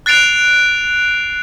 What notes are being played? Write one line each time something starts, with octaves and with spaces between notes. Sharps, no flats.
F#6 A6 C7 D7 F7